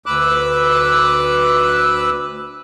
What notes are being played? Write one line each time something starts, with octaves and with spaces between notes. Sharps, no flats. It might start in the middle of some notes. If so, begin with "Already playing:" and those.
D2 B4 D6 E6 F#6